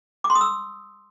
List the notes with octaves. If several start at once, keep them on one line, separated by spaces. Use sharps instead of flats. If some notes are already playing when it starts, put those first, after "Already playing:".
D6
C6
D#6
E6